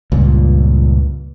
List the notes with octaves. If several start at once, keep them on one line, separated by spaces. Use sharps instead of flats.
C#2 G2 A#2